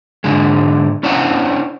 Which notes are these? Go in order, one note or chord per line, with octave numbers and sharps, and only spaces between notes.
G#2 D3 G#3
C#4 D4 E4 C5 C#5 F#5